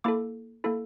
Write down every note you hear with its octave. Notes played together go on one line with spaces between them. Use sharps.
A#3 E4 A4 D6
A#3 E4 A4